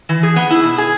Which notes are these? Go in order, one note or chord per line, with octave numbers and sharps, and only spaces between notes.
E3
G#4
B3
E4
B2
G#4